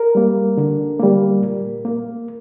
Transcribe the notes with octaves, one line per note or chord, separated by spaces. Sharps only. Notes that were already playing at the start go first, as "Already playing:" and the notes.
Already playing: A#4
G3 A#3
D3
G3 A#3
A#2
A#3